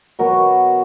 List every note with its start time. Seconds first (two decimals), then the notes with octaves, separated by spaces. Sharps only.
0.19 B2 F#3 B3 A#4